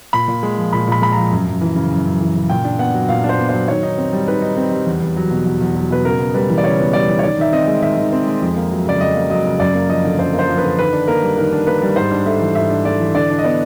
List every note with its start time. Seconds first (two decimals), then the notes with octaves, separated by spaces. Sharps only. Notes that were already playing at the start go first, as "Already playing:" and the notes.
0.13 A#2 B5
0.28 A#2
0.43 G#3
0.58 F3
0.73 A#2 B5
0.87 A#2 B5
1.02 G#3 B5
1.12 F3 A#5
1.31 F#2
1.47 F#2
1.61 E3
1.76 C#3
1.91 F#2
2.05 F#2
2.20 E3
2.36 C#3
2.49 A#2 G5
2.65 D4
2.79 B3 F#5
2.94 F#3
3.09 A#2 F5
3.24 D4
3.29 C5
3.39 B3
3.49 F#3 C5
3.68 D#3 C#5
3.83 D#4
3.98 C4
4.13 G3
4.28 D#3 B4
4.42 D#4
4.57 C4
4.71 G3
4.86 E2
5.02 E2
5.16 F#3
5.31 B2
5.46 E2
5.61 E2
5.75 F#3
5.90 B2 B4
6.05 C#3 A#4
6.20 B3
6.34 G3 B4
6.49 E3
6.58 D5
6.64 C#3 C#5
6.79 B3
6.93 G3 D5
7.08 E3
7.19 C#5
7.23 D#3 D5
7.38 D#3 E5
7.52 C4 D#5
7.68 G#3
7.82 D#3 E5
7.97 D#3
8.13 C4
8.27 G#3
8.42 F2
8.56 A#3
8.71 F#3
8.86 C#3 D5
9.01 F2 D#5
9.15 A#3
9.30 F#3 D#5
9.45 C#3
9.60 F#2 D5
9.75 A#3
9.89 F3 D#5
10.05 D3
10.19 F#2 C5
10.34 A#3
10.39 C5
10.49 F3
10.58 B4
10.63 D3
10.78 D#3 B4
10.93 D4
11.08 A#3 A#4
11.23 G3
11.38 D#3 A#4
11.52 D4
11.67 A#3 B4
11.82 G3
11.96 G#2 C5
12.11 D4
12.26 A3 E5
12.41 E3
12.55 G#2 E5
12.70 D4
12.85 A3 D5
13.00 E3
13.15 D3 D5
13.30 D4
13.39 D#5
13.44 B3 D5